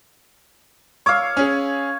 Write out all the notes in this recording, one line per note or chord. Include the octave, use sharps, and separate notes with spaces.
C#5 F5 C#6 D6 E6
C#4 G#4